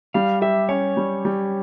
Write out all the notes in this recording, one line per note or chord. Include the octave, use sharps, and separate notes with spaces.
G3 F5
G4 E5
C#4 C#5
G3
G3